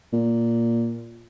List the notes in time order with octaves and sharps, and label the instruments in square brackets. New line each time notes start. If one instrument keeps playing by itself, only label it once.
[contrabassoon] A#2